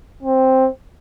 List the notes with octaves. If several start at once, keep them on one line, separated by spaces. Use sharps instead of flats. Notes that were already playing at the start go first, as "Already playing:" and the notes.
C4